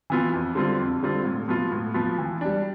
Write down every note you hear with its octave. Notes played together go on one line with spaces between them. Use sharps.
E3 B3 F4
F2
D3 G3 C4 F4
F2
D3 G3 C4 F4
A2
F3 B3 F4
A2
F3 B3 F4
E3
G3 D4